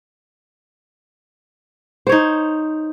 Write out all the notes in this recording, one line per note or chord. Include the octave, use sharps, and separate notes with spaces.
D#4 C5 C#5